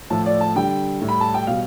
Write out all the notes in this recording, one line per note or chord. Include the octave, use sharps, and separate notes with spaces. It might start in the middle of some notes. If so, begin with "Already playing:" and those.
A2 F3 A3 A5
D5
A5
D3 G3 G5
A2 G3
B5
A5
G5
B2 G3 F5